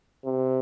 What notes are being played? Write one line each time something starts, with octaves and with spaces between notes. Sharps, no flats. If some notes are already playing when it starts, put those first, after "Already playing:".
C3